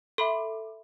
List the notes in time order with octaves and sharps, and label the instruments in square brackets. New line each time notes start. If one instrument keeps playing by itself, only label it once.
[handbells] A4 [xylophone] E5 B5 C6